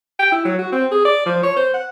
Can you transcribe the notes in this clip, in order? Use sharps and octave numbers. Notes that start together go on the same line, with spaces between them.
G5
E4
F#3
F#4
C4
G#4
D5
F3
C#5
C5
F#5